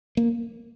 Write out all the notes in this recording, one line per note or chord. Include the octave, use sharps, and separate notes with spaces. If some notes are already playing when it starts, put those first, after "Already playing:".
A#3